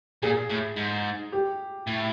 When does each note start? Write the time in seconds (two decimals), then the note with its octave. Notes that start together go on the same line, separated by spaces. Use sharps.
0.23 A#2 G#4
0.50 A2
0.77 G#2
1.32 G4
1.87 A2